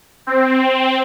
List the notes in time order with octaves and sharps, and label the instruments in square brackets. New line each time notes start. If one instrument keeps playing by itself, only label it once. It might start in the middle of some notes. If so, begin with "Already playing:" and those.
[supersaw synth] C4